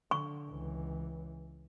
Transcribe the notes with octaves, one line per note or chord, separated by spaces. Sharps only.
D3 C#6
C#2 E3